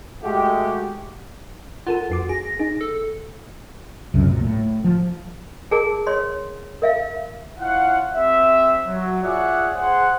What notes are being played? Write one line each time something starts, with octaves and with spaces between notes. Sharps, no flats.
G#3 A3 F#4 G4
F4 A4 A#4 F#5
F2 F#4 D6
G#4 A#6
D#4 G#4
A4
C#2 F#2 C3
A#2
A2
F3
G#4 A#4 A5
C#5 C6
A#4 E5 F5
E4 F4 C#5 F5 F#5
C4 G4 C5 E5
F#3
F4 G#4 C#5 D5 E5 F#5
G#4 C5 F#5